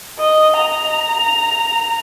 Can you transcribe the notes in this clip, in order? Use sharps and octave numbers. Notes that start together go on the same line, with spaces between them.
D#5
A#5